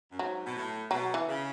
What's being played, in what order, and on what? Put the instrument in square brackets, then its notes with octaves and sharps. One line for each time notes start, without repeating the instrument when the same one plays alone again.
[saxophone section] F#2
[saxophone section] G#2 [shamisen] F#3
[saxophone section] B2
A2
[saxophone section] B2 [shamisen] F#3
[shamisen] E3
[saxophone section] C#3